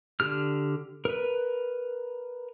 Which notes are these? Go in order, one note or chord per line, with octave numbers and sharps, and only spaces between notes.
D3 G4 F6
A#4 B4